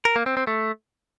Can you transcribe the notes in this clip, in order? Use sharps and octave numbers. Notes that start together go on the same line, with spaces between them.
A#4
A#3
C4
C4
A3